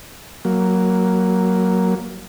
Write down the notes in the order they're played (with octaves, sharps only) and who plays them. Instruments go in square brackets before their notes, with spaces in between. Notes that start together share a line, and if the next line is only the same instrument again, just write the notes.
[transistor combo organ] F#3 A#3